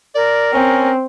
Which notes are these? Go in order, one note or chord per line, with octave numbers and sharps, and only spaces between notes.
A#4 D5
C4 C#4